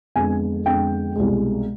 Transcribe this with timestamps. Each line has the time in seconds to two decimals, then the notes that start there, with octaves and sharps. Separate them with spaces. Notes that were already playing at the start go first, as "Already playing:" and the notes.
0.16 F2 D3 G#3 B3 G#5
0.66 F2 D3 G#3 B3 G5
1.16 C2 B2 G#3